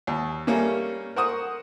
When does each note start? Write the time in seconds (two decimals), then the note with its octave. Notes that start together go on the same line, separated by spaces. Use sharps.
0.07 D#2
0.47 G3 A3 A#3 C#4
1.16 A#4 C5 F#5 C#6 D#6